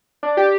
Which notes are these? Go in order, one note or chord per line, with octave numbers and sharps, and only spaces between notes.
D4
G4